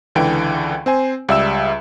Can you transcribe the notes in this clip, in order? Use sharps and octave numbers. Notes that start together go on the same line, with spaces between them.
C#2 D3 E3 G5 D7
C4 C5 G#5
C#2 G3 E5 E6 E7